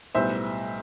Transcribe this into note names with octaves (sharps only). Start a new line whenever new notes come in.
B1 A2 G3 B3 C5 E5